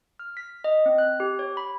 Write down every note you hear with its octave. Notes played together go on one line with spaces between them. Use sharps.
F6
B6
D#5
C4
F#6
G4
C#5
B5